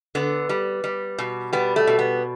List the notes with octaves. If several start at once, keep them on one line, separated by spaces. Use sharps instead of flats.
D3 B3
G3
G3
B2
G3 B3
A3
B2
B3